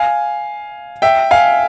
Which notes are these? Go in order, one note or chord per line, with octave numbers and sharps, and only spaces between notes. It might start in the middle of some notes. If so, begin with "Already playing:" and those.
Already playing: F5 G#5
E5 G5
F5 G#5